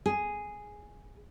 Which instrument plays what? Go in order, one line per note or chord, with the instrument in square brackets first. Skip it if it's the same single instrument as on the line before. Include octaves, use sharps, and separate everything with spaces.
[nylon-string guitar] G#4